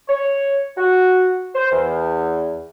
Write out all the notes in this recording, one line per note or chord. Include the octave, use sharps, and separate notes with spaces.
C#5
F#4
C5
E2